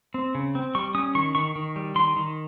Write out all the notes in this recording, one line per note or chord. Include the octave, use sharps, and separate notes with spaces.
C4
C#3
C4
G3 C#6
C#4 D#6
D#3 C#6
D#3 C#6
D#3
G3
D#3 C6
D#3